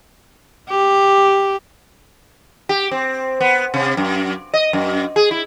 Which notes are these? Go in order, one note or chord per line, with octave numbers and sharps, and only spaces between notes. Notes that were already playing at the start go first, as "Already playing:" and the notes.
G4
G4
C4
B3
C3
F#2
D#5
F#2
G#4
E4